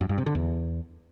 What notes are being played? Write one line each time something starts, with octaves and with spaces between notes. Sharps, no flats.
F#2
G2
C3
D3
E2